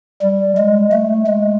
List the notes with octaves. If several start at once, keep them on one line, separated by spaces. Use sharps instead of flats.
G3
G#3
A3
G#3